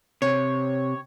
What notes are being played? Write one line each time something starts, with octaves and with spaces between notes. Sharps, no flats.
C3 C#5